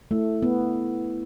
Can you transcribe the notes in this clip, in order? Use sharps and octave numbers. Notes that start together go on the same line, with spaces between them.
A3 E4
B3 E4